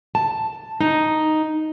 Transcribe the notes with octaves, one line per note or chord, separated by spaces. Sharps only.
A5
D#4